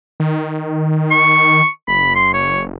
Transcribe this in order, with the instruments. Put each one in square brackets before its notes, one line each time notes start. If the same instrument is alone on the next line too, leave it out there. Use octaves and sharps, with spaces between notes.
[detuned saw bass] D#3
[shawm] C#6
[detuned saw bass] F#1 [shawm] B5
[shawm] C6
C#5